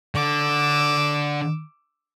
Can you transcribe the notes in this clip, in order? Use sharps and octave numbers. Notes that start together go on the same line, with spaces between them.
D3 D6 E6